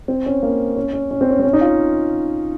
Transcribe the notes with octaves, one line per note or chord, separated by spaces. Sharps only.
C4
C#4
A#3
C#4
C#4
C#4
C4
C#4
C4
C#4
D#4
F4